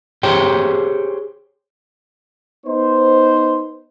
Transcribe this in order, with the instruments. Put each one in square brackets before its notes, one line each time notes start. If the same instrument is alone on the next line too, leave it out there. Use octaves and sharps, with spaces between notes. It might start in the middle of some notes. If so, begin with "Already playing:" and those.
[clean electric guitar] G4 G#4 C5 C#5 G5
[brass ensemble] B3 D#4 C5